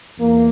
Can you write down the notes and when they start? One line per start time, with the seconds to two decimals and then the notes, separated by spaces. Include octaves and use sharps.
0.19 E2 A#3